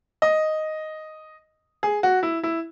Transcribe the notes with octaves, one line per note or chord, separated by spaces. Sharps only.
D#5
G#4
F#4
E4
E4